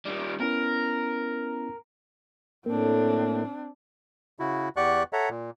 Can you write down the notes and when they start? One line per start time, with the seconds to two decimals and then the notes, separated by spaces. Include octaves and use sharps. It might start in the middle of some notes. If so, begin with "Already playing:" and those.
0.06 D#3 G3
0.40 B3 C#4 E4 A#4
2.66 A2 A#3 C4 D4
4.40 C#3 E4 F#4
4.77 E2 G4 D5 F#5 C#6 F#6
5.13 A4 C#5 E5 F#5 A#5
5.30 A#2